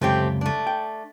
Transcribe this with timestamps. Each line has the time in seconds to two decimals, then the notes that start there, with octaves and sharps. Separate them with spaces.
0.02 C#2 F#2 C3 A3 C4 G4
0.41 A3 D4
0.67 G5